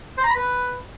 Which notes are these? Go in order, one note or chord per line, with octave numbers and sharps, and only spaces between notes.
C5
A#5
B5
B4